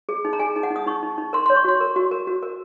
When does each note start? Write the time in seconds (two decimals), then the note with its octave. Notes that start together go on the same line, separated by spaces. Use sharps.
0.09 G#4
0.25 D#4
0.33 A#5
0.39 G#4 G#5
0.56 D#4
0.63 F#5
0.71 D#4
0.76 D#6
0.87 D#4 C#6
1.03 D#4
1.18 D#4
1.33 A#4 C6
1.46 C6
1.50 C#5
1.56 C#6
1.64 F#4 C6
1.81 A#4
1.96 F#4
2.11 A#4
2.27 F#4
2.43 A#4